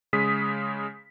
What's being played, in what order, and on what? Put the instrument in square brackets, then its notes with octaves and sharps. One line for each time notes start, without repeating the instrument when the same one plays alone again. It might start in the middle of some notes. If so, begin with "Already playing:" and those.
[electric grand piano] C#3 G#3 D#6 B6